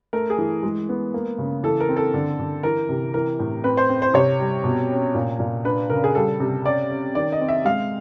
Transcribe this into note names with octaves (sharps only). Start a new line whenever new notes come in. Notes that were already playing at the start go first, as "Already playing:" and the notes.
A3 A#4
G#4
E3
G#3
B3
A#3
C#3
E3 A4
A#4
C4
A4
D3
D3
E3 A#4
C3
E3 A#4
A2
C4 B4
C5
C4
C5
C3 C#5
G3
B2
C#4
A#2
A#2
D4 B4
C#3 A#4
G#4
G3 A4
C3
C#4 D5
C#4
D#3 D5
D#5
C4
E5
G#3 F5